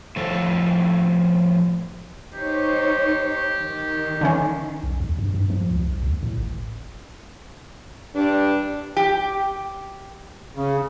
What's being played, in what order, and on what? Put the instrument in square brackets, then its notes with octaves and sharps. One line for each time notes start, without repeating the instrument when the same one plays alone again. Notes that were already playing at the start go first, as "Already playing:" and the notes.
[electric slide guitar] A2 F3 A4
[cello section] D#4 C5 C#5 [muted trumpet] G4
[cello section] D#3
[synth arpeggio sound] D3 E3 C#4
[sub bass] B1
D#2
G2
G2
F3
C#2
B1
D2
A2
G#1
[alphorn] G2 [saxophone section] D4
[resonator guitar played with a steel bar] G4
[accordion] C#3